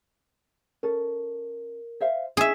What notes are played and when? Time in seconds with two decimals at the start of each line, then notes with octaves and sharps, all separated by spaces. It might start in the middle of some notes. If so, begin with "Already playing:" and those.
0.83 C#4 A4 A#4
2.00 C5 E5 F5
2.37 C#4 D4 E4 G#4 E5